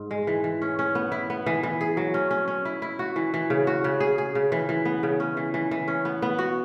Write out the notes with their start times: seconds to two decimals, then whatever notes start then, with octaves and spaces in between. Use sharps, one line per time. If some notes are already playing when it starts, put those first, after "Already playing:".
Already playing: G#2
0.11 G#3
0.27 E3
0.44 E3
0.62 C#4
0.79 C#4
0.95 B3
1.12 E4
1.30 B3
1.46 E3
1.63 E3
1.81 G#4
1.97 F#3
2.14 C#4
2.31 C#4
2.48 C#4
2.65 E4
2.82 E4
2.99 F#4
3.16 E3
3.34 E3
3.50 C#3
3.67 F#4
3.84 C#3
4.00 G#4
4.18 G#4
4.35 C#3
4.52 E3
4.69 E3
4.85 B3
5.03 C#3
5.20 C#4
5.37 E3
5.54 E3
5.71 E3
5.88 C#4
6.05 B3
6.22 B3
6.38 F#4